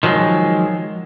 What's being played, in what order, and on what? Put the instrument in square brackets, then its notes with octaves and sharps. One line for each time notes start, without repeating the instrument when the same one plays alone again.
[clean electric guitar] D#3 F3 F#3 G#3